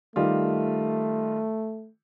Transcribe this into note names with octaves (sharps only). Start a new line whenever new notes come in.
D#3 G3 A3 F4